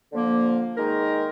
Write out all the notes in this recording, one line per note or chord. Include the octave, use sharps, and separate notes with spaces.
D3 F3 A#3
D#3 G#3 D#4 A#4